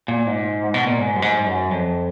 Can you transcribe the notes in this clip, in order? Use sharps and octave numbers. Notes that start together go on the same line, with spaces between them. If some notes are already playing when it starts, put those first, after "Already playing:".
A#2
G#2
B2
A#2
G#2
F#2
G#2
G#2
F#2
F2